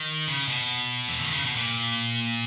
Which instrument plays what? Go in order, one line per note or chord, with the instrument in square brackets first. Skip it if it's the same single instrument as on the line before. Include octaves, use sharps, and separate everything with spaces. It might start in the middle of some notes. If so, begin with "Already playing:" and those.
Already playing: [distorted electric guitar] D#3
C#3
B2
E3
D#3
C#3
B2
A#2